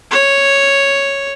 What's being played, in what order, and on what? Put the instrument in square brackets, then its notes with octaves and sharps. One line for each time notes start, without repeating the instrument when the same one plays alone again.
[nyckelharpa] C#5